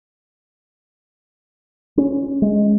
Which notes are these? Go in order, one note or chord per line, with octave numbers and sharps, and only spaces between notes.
C#4
G#3